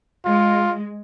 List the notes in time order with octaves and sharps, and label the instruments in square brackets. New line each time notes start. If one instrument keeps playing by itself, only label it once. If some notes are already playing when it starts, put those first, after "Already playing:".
[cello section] G#3 [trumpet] F4